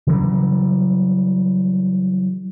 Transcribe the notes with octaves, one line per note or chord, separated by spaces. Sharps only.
C#3 E3 F#3 G3